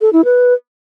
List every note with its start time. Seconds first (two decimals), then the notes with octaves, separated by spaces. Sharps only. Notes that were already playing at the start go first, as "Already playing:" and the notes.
0.01 A4
0.13 E4
0.25 B4